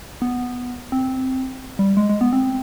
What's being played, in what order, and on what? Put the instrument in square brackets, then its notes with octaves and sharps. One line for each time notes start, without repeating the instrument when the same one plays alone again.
[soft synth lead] B3
C4
G3
G#3
G#3
B3
C4